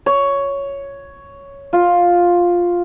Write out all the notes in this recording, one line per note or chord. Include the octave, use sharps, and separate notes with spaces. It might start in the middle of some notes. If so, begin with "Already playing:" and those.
C#5
F4